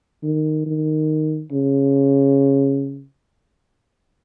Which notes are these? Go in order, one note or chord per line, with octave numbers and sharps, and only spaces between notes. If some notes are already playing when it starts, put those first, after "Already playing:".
D#3
D#3
C#3